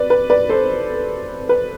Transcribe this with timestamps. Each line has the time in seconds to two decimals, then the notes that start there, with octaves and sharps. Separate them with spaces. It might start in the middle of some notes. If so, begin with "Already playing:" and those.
Already playing: B4 D5
0.10 B4
0.30 B4 D5
0.49 A4 C5
1.49 B4